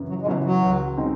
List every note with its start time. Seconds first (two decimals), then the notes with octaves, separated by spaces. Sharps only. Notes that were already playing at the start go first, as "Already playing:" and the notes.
Already playing: F#2 C#3 E3
0.09 F#3
0.22 G#3
0.26 C#3 E3 F#3
0.44 F#3
0.62 C#2
0.98 C#3 G#3 C4 D#4